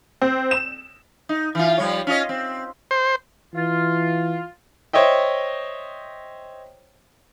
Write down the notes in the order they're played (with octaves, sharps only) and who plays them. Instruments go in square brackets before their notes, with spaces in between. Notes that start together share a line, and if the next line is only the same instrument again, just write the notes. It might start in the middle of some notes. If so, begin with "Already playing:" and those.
[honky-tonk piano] C4
E7
[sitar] D#4
E3 F4
F3 G3 C#5
C#4 F4 D#5
C4
[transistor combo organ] C5
[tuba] E3 [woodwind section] F4
[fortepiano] C5 C#5 D#5 E5 G5